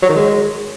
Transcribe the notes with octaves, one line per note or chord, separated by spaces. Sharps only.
F#3
D#3
G#3